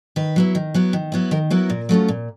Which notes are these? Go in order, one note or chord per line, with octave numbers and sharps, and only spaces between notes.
D#3 B4
F#3 B3 E4
D#3
F#3 B3 E4
D#3
F#3 B3 E4
D#3 A#4
F#3 B3 E4 A#4
A#2
F#3 A3 C#4 F4
A#2